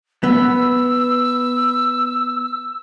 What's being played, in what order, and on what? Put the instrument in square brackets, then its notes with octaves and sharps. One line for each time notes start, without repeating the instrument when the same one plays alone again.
[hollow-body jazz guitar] B3 [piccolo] E6